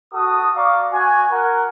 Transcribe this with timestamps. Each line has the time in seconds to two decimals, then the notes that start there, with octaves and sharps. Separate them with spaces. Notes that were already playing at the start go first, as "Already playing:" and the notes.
0.13 F#4 A4 D#6
0.56 D5 F5 A#5 C#6 D6
0.93 F#4 G#5
1.32 A#4 F#5